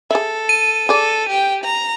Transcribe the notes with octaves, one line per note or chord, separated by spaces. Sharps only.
G#4 A4 E5
D#7
G#4 A4 D5
G4 G5
A#5